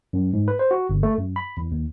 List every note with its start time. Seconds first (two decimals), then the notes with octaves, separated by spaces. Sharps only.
0.13 F#2
0.33 G#2
0.48 B4
0.59 C5
0.71 F#4
0.90 G1
1.03 A3
1.18 F#2
1.36 B5
1.57 E2
1.72 D#2